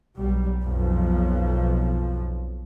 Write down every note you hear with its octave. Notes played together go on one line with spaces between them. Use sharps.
B1 G3
B1 F2 F3